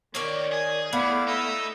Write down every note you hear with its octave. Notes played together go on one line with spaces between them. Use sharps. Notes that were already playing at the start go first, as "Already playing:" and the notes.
D#3 A#3 G4 C#5 D5
G#4 G#5 D#6
A3 B3 E4 D5 F5
D#4 D#6 E6